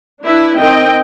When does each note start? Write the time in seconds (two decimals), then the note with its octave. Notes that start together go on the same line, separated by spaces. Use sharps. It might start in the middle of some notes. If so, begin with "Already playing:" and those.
0.24 D4 E4 B4 E5
0.58 D#3 C4 D#5 G5